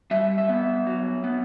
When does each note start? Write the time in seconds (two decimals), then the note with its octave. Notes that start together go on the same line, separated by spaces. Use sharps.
0.11 G3 E5
0.38 E5
0.49 B3
0.87 F#3
1.24 B3